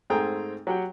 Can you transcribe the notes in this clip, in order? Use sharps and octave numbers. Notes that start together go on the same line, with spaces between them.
G#2 A3 C4 G#4 G5 A#5
F#3 G4 F#5 G5